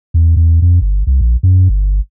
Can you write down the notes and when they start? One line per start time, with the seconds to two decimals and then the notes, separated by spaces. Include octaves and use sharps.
0.14 E2
0.36 E2
0.62 F2
0.81 G1
1.07 C2
1.21 A#1
1.43 F#2
1.69 G1